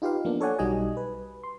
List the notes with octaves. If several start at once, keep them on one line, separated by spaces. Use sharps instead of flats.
D#4 F4 G4 B4 F5
F3 A#3 B3 D4
A4 C#5 D5 F#5 G#5
B1 G3 D#4 F#4 D#5 G#5
B4
C6